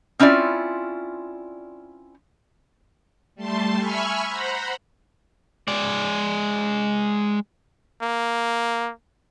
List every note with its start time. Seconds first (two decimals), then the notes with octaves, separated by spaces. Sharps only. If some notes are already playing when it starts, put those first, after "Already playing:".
0.19 C4 C#4 E4 F4 D5
3.35 G3 A3 A5 C6
3.78 E5 G#5 B5 C#6 E6 F6
4.27 C5 F#5 A#5 B5
5.68 G#3 D5
8.02 A#3